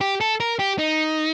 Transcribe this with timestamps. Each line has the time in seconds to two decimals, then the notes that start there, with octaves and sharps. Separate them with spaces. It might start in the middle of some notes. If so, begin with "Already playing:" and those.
0.01 G4
0.21 A4
0.40 A#4
0.59 G4
0.79 D#4